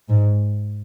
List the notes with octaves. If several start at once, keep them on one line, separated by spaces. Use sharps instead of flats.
G#2